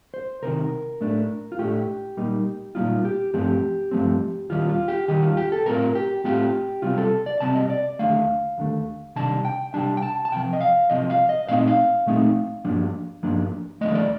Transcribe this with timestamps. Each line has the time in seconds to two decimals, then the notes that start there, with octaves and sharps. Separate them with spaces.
0.14 C5
0.42 C2 C3 D#3 A#4
1.01 A2 A3 D4
1.52 F4
1.59 A2 A3 D4 G4
2.17 A#2 G3 A#3 D#4
2.75 A#2 G3 A#3 D#4 F4
3.05 G4
3.34 G2 F3 A3 C4 G4
3.91 G2 F3 A3 C4
4.50 D#2 D#3 G3 F4
4.70 F4
4.88 G4
5.08 D#2 D#3 G3 G4
5.23 F4
5.37 G4
5.52 A4
5.66 A2 A3 C4 F4 A#4
5.95 G4
6.24 A2 A3 C4 F4 G4
6.82 C3 G3 C4 F4
6.98 A4
7.26 D5
7.40 C3 G3 C4 A5
7.55 D#5
7.70 D5
7.99 D#2 D3 A3 F5
8.58 D#2 D3 A3
9.16 C3 D#3 G3 D4 A5
9.45 G5
9.74 C3 D#3 G3 D4 A5
9.97 G5
10.02 A5
10.25 A5
10.32 C2 C3 F3 G5
10.53 D#5
10.61 F5
10.90 C2 C3 F3 D#5
11.10 F5
11.29 D#5
11.48 A#2 A3 C4 D#4 F5
11.58 D#5
11.67 F5
12.06 A#2 A3 C4 D#4
12.65 G2 F3 A#3 D4
13.23 G2 F3 A#3 D4
13.81 D#2 D3 F3 A3 D#5
13.95 D5